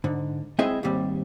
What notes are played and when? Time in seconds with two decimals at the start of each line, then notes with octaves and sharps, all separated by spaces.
0.04 G#2 D3
0.59 G#3 C4 E4 G#4 D#5 E5
0.83 D#2 G#2 G3 C4